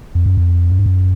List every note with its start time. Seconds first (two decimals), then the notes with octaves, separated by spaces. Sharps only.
0.15 F2
0.26 F#2
0.37 F2
0.72 F#2
0.79 G2
0.86 F#2